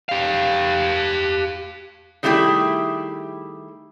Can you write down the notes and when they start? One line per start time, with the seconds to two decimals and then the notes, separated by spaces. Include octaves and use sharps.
0.09 G4 F5
2.23 D#3 G3 A3 E4 G4 G#4